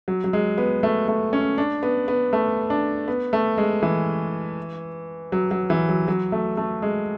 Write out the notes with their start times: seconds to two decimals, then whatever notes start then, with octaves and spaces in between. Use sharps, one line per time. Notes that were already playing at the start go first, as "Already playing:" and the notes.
0.08 F#3
0.24 F#3
0.33 G#3
0.58 B3
0.83 A3
1.08 A3
1.33 C#4
1.58 D4
1.83 B3
2.08 B3
2.33 A3
2.70 D4
3.08 B3
3.33 A3
3.58 G#3
3.83 E3
5.32 F#3
5.51 F#3
5.70 E3
5.89 F#3
6.08 F#3
6.32 A3
6.57 A3
6.82 G#3